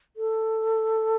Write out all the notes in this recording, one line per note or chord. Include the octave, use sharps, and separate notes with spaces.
A4